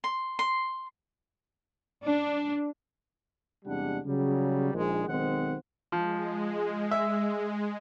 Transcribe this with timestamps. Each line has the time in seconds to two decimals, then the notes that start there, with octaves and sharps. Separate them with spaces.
0.04 C6
0.39 C6
2.05 D4
3.65 E2 C3 G3 G#3 D4 F#5
4.05 C#3 F#3 G3
4.73 A#1 D#3 G#3
5.08 B1 D#3 G#3 C4 C5 F#5
5.92 F3 G#3
6.91 E5